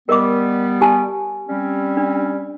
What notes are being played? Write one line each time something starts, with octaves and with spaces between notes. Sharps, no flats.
G3 B3 A#4 D#5 D6
G4 G#5 A5
G3 C4 C#4
D4